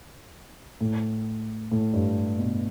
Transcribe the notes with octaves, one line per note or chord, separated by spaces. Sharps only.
A2
A2
G2
B2